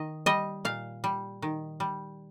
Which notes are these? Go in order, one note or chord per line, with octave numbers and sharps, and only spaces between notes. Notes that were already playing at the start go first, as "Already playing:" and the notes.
Already playing: D#3 D#5
G3 D#5
A#2 F5
G3
D#3
G3